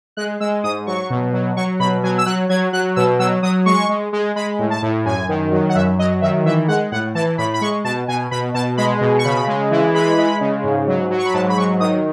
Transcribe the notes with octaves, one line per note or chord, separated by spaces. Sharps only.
G#3 F#6
G#3 E6
G#2 D#6
F#3 C#6
B2
F#3
F#3 C#6
B2 B5
F#3 G#5
E6
F#3 F#6
F#3 G#6
F#3 F#6
B2 E6
F#3 E6
F#3 D#6
G#3 C#6
G#3
G#3
G#3 B5
A2
A5
A2
F#2 G#5
D#3
F#3
F#5
F#2 E5
F#3 D#5
D#3 E5
E3 E5
G#3 F#5
A2 F#5
E3 A5
A2 B5
B5
G#3 C#6
B2 A5
B2 G#5
B2 B5
B2 A5
G#3 B5
B2
C#6
C#3 B5
G#3
E3
G#3 B5
G#3
C#3
G#2
F#3
F#3
C#6
B5
G#2 A5
B5
F#3 C#6
D#3 D#6